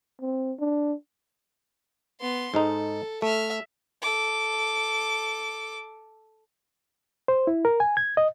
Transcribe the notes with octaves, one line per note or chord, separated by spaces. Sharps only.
C4
D4
B3 C6
G#2 G#3 D#4 A4
A3 E5 F6
A4 D6
C5
E4
A#4
G#5
G#6
D#5